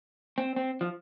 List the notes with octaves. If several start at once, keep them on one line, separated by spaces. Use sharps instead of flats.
C4
C4
F3